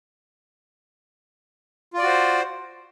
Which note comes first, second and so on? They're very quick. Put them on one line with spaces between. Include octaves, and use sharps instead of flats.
F4 D5 F#4 C5